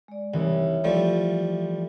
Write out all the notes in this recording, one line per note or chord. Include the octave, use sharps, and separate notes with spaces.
G#3 D5
C2 E3 G3 D#4 C#5
F3 G3 A3 A4